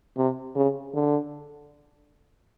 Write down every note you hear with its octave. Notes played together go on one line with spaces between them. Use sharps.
C3
C#3
D3